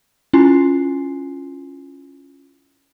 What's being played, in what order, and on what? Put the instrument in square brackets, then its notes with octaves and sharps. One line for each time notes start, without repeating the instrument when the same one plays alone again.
[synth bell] C#4 E4 F4 G#5 C6 C7